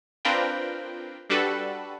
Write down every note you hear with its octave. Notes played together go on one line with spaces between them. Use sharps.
C4 D4 F4 A#4 B4 G5
G3 D4 F#4 A4 B4